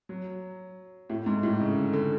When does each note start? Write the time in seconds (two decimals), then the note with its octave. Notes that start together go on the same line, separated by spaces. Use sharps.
0.09 F#3
1.10 A2
1.26 G#2
1.43 A2
1.60 C#3
1.76 D3
1.93 D3